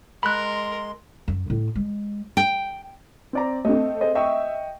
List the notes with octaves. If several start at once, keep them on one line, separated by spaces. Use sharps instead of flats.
G#3 A#4 B5 C6 F#6
F#2
A2
G#3
G5
C4 D5 A#5
A3 C4 D#5
G#4 C5 D#5
D#5 E5 G5 C#6